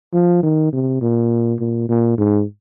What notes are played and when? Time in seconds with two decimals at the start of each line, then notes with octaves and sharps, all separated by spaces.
0.13 F3
0.43 D#3
0.73 C3
1.02 A#2
1.60 A#2
1.89 A#2
2.18 G#2